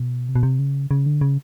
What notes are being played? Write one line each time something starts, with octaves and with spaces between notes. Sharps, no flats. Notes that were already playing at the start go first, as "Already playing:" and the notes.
Already playing: B2
C3
B2
C3
C#3
C#3
D3
C#3